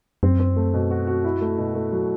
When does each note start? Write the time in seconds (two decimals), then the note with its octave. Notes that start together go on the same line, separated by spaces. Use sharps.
0.23 F#2 C4
0.40 C4
0.56 A3
0.74 B2
0.91 F#4
1.07 F#4
1.24 E4
1.41 A3
1.58 B2
1.75 A3
1.92 F#3